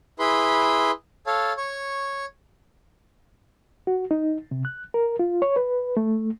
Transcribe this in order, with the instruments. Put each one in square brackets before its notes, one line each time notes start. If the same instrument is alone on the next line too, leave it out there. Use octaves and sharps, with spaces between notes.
[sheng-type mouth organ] E4 G#4 B4 B5 C6
A4 C#5 F5 A5
C#5 C#6
[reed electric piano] F#4
D#4
C3
F#6
A#4
F4
C#5
B4
A3